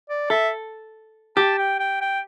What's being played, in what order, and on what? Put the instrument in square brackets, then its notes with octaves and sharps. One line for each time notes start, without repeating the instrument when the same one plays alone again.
[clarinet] D5
[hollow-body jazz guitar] A4 [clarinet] E5
[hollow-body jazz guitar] G4 [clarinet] A5
[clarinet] G5
G5
G5